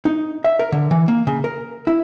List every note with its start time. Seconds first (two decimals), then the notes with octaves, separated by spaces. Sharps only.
0.05 D#4
0.44 E5
0.59 A#4
0.72 D3
0.91 E3
1.08 A#3
1.27 C#3
1.44 A#4
1.87 E4